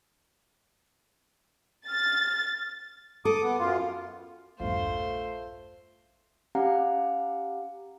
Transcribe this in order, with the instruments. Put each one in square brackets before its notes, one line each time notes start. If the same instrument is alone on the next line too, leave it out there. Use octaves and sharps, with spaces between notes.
[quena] F6 [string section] A6
[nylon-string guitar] A4 [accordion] D6 D#6
[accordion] B3
F#2 F4
[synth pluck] A#1 E2 G2 [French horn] A3 [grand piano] F4 [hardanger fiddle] C5
[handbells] C#4 G4 F5 F#5 A#5